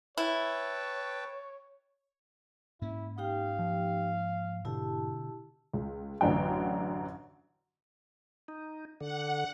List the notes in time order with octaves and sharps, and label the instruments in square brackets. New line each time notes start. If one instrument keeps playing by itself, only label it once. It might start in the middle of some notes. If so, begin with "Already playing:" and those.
[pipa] E4 [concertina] B4 G5 A5 [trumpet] C#5
[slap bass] G#2 A#3 C#4 [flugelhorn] E4
[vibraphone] D#4 G4 G5 [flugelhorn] F5
[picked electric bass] F3
[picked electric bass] B2 D3 [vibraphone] E4 G4 A5
[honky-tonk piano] C#2
A1 F#2 D3 F#3 G5
[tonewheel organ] D#4
[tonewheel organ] D3 [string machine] F#5